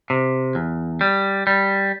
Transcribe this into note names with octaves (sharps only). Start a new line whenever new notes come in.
C3
E2
G3
G3